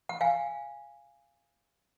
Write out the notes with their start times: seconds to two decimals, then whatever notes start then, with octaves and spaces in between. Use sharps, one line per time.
0.09 F#5
0.21 F5 G#5